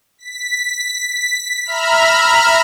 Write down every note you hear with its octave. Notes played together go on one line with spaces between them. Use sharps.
B6
E5 A#5 B5 F6